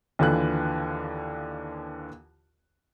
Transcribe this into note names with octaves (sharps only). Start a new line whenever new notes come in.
D#2 D3 E3 F4 F#6